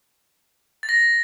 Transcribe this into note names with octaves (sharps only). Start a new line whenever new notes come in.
A6
A#6